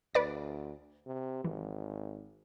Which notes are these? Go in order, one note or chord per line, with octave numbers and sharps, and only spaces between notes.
D2 B4 D5 A6
C3
G#1 E3